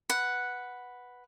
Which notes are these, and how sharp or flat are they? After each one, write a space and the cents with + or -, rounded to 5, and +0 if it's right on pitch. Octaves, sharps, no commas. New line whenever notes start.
B4 +0 F#5 +0